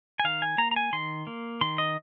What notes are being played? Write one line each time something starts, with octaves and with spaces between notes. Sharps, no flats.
G#5
D#3 F5
G#5
A#3 A#5
A#5
G#5
D#3 C6
A#3
D#3 C6
D#5